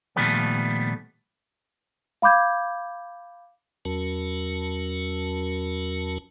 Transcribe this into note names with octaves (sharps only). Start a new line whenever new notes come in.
A#2 D#3 F3 G3 A3 B3
F5 B5 D6 G6 G#6
E2 F#3 C#4 F#4 A#4 A5